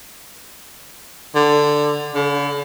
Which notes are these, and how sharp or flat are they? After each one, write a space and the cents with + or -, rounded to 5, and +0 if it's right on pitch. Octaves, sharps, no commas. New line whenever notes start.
D3 +10
D3 -45